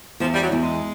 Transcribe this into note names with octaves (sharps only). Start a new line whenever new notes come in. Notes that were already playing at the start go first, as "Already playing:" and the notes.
E2 F3
G3
F#3
E2
G#3